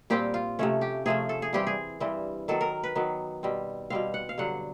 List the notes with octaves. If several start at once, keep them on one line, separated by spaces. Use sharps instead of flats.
A#2 G3 C4 G4
F4
C3 F3 A3 C#4
G4
C3 F3 A3 C#4 G#4
A4
G#4
G2 E3 G3 C4 G4
G#4
G2 E3 G3 C4
D#3 F#3 B3 A4
A#4
B4
D#3 F#3 B3
B2 G3 C4
B2 G3 C4 F5
F#5
F5
G2 D3 F#3 F#5